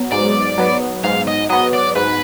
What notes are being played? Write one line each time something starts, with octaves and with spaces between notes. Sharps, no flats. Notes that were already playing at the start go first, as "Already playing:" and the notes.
Already playing: F#3 B3
G#2 D5
F#3 B3
G#2 F5
D#5
F#3 B3 D#5
D5
G#2 B4